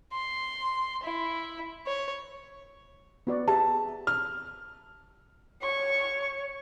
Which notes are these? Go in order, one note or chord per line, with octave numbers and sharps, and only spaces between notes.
C6
E4
C#5
B3 F#4 D5
G4 G#4 E5 A5
F6
C#5 C#6